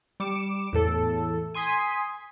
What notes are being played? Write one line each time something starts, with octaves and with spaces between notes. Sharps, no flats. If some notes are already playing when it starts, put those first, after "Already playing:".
G3 D6 C#7 E7
E2 A2 A4
G#5 C6 D#6 B6